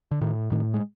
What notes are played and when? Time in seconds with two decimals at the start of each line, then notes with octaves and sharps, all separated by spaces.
0.11 D3
0.21 A2 D#3
0.52 A2 D#3
0.74 G#3